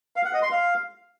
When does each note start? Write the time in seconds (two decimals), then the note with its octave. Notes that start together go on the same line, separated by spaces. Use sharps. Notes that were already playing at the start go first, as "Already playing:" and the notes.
0.16 F5
0.25 F#5
0.34 D#5
0.43 C6
0.51 F5